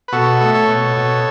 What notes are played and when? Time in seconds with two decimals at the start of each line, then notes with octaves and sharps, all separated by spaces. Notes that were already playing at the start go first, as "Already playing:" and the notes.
0.08 B4
0.12 B2 F#4 A4
0.41 A3
0.54 A4 C#5
0.68 B2
0.97 B2